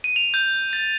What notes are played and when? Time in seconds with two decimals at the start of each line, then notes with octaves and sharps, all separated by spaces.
0.04 D#7
0.16 F7
0.34 G6
0.73 A6